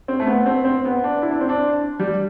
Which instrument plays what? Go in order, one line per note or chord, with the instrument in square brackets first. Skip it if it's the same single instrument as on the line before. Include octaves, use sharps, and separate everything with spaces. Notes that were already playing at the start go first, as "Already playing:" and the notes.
[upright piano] C4
A3
B3
C4
C4
B3
D4
E4
D4
C4
D4
G3